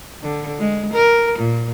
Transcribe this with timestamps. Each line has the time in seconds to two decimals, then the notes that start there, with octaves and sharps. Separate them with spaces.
0.23 D3
0.59 G#3
0.93 A#4
1.39 A#2